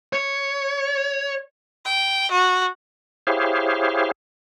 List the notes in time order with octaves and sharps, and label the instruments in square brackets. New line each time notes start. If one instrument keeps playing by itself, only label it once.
[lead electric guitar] C#5
[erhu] G5
F#4
[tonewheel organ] E4 G4 G#4 C5 C#5 F5